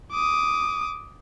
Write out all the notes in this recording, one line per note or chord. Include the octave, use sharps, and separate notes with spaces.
D6 D#6